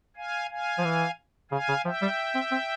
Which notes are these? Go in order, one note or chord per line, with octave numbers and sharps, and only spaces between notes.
F5 G#5
F5 G#5
F3
E3
C#3 F5 G#5
C#3
F3 E5 G5
G3
C4
C4